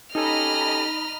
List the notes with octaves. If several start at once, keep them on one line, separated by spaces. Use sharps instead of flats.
C#4 D#4 G4 A4 D#5 A#5 B5 F6